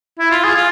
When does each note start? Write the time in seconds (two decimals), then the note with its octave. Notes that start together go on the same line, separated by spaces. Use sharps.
0.19 E4
0.31 F4
0.44 G#4
0.56 F4